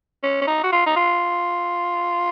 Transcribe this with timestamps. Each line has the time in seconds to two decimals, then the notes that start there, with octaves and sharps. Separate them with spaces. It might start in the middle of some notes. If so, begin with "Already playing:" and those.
0.23 C#4
0.42 C#4
0.47 D#4
0.64 F#4
0.72 F4
0.87 D#4
0.96 F4